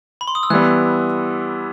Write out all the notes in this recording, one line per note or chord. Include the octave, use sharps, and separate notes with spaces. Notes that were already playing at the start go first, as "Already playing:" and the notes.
B5
C6
D#6
E6
E3 G3 B3 F#6